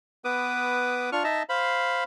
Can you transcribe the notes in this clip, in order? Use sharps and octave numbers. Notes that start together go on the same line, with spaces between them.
B3 B4 D6 D#6
D4 F4 C#6 F6
D#4 D#5 E5 A5
C5 F5 B5